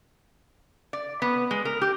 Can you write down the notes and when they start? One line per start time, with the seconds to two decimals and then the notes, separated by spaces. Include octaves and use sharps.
0.93 D5
1.22 B3
1.51 G#3
1.65 A#4
1.82 G4